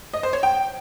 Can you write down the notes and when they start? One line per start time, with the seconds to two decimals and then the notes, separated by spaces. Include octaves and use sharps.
0.14 D#5
0.23 C5
0.33 C#5
0.43 G5